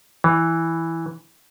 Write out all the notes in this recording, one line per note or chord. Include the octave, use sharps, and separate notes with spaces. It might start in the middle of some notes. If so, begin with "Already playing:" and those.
E3